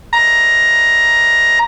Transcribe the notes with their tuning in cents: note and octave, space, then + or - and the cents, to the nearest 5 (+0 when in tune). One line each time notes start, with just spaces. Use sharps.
A#5 +10